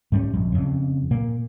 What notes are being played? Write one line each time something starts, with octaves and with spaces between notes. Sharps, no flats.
G#2 G3 C#4
A#1 F2
F2 C#3
A#2 A#3